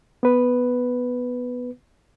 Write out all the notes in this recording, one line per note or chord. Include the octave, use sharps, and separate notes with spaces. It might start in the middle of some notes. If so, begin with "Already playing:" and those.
B3 B4